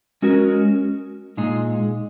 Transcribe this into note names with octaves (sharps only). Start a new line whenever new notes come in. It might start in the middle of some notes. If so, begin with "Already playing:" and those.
G#3 C#4 F#4 A#4
A#2 G#3 D#4 G#4